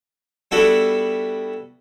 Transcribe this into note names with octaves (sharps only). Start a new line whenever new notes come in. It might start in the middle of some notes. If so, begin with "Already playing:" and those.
G3 B3 D4 E4 F#4 A4